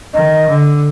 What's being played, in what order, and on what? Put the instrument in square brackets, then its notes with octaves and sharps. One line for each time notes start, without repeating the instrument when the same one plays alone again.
[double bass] D#3 [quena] D#5
[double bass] D3